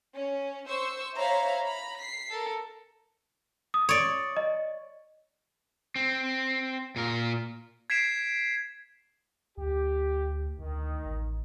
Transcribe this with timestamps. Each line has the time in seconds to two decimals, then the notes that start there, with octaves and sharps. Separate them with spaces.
0.15 C#4
0.68 C5 C#6 E6
1.16 C5 C#5 E5 F5 A#5 B5
1.65 A#5 B5
2.00 B6 C7
2.31 A4 A#4
3.74 D#6
3.89 C#5 D5
4.37 D#5
5.96 C4
6.96 A#2 A#4
7.90 G#6 B6 C7 D7 E7
9.57 D2 G4
10.59 D2 D#3
11.05 A1